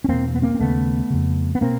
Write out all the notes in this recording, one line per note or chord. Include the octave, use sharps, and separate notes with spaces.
C#4
E2 B2 A#3 C4
B3
A#3 C4
C4
D#2 C#3 A3 B3
F2 C#3
B3
B2 A#3 C4